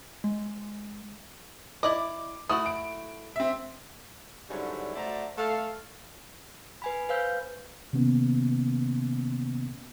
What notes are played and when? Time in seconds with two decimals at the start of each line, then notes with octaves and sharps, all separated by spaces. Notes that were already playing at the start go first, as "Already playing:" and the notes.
0.24 G#3
1.83 E4 D5 D#5 D6
2.49 A3 E4 F#4 D#6
2.66 D7
3.36 C4 E5
4.50 G#2 D3 F#3 G3 C#4 E4
4.95 A3 F#4 C5 D5 E5 A#5
5.38 A3 A4 F5
6.82 B4 G#5 B5
7.09 B4 C5 F5 E6 G6
7.93 C3 D#3 A#3 B3 C#4